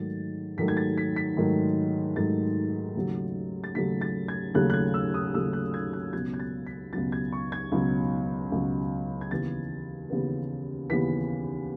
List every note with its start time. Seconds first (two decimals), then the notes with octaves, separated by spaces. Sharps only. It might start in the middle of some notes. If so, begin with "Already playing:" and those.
Already playing: G#2 D#3 F#3 A3 A6
0.57 G#2 D#3 F#3 A3 B6
0.68 G#6
0.77 A6
0.98 B6
1.16 B6
1.37 G#2 D#3 F#3 A3
2.16 G#2 D#3 F#3 A3 A6
2.96 D#2 C#3 F#3 A3
3.64 A6
3.75 D#2 C#3 F#3 A3 B6
4.01 A6
4.28 G#6
4.54 D#2 C#3 F#3 A3 F#6
4.70 F#6
4.74 G#6
4.94 E6
5.14 D#6
5.34 D#2 C#3 F#3 A3 E6
5.53 F#6
5.74 G#6
5.93 F#6
6.13 C#2 B2 F#3 G#6
6.34 G#6
6.40 A6
6.67 B6
6.93 C#2 B2 F#3 A6
7.12 G#6
7.33 C#6
7.52 G#6
7.72 C#2 B2 F#3
8.52 C#2 B2 F#3
9.21 G#6
9.31 D#2 C#3 E3 B3 A6
10.10 D#2 C#3 E3 B3
10.90 D#2 C#3 E3 B3 B6